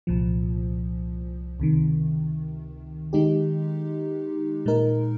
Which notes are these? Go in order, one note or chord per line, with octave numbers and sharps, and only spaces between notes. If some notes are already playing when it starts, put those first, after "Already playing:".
C2 A#2 F3
C#2 C3 D#3
D#3 G#3 D#4 G4
A#2 G#3 D#4 A#4